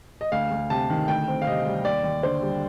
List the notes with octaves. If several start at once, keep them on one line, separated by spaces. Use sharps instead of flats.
D#5
D2 F5
D2
C3 A5
D#3
D2 G5
C4
F5
C3 D#5
G3
D#2 D5
D#2
D3 C5
G3